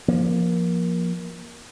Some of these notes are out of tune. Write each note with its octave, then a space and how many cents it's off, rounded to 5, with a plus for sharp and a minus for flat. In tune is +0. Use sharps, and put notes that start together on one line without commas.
F3 +0 A#3 +20